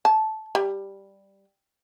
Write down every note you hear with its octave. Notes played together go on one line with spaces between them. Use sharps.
A5
G3